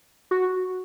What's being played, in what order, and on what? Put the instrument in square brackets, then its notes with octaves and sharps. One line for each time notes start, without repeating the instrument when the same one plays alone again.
[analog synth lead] F#4